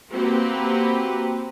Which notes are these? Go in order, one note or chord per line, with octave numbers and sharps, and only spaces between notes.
A#3 C4 F#4 G4 B4